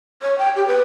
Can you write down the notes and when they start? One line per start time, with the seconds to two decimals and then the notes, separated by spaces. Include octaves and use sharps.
0.22 C#5
0.38 G5
0.56 G4
0.68 B4